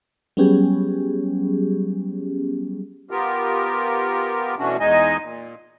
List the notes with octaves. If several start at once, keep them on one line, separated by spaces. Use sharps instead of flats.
F#3 G3 B3 C#4 G4 G#4
B3 F4 G4 A#4
B2 E3 A3 C#4 D4 F#4
E2 G#3 D#4 D#5 G#5
A#2